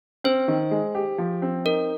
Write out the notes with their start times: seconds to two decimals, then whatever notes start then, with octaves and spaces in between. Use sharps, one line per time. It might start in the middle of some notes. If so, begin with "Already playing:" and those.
0.24 C4 C5
0.48 D#3
0.71 G#3
0.95 G4
1.18 F3
1.42 C4
1.65 D#4 A#4